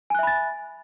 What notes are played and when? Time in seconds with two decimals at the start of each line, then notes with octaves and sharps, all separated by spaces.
0.10 G#5
0.15 F#6
0.19 E5
0.23 B5
0.27 A6